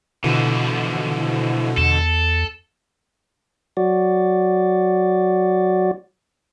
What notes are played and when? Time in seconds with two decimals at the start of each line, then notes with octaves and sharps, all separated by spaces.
0.24 B2 D3 E3 F3
1.78 E2 A4
3.77 F#3 F#4 D5